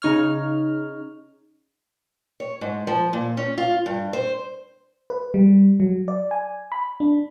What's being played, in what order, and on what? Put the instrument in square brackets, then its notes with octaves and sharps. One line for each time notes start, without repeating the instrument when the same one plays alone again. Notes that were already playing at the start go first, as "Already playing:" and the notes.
[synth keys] C#3 D#4 C#5 F6
[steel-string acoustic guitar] C#5
G#2
F3
A#2
C#4
F4
G2
C5
[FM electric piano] B4
G3
F#3
D5
G#5
B5
D4